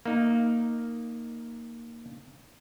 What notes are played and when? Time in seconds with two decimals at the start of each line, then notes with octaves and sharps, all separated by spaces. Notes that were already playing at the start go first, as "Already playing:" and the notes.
0.05 A#3 D#4